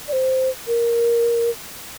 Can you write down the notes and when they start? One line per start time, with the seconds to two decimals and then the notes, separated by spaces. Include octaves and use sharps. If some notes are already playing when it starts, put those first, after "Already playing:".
0.08 D5
0.13 C5
0.67 A#4